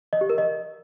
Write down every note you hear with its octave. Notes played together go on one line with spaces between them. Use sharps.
D#5
G4
A#4
D#5